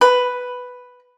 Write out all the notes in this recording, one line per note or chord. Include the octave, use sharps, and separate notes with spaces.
B4